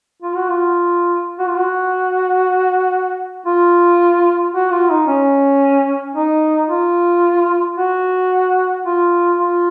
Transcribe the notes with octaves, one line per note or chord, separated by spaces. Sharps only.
F4
F#4
F4
F#4
F4
F#4
F4
F#4
F4
D#4
C#4
D#4
F4
F#4
F4
F4